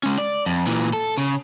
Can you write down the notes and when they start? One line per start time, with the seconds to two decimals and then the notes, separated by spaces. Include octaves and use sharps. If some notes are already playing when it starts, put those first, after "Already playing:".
0.03 G#3 C#4
0.18 D5
0.46 F2
0.67 A#2 E3
0.93 A4
1.18 C#3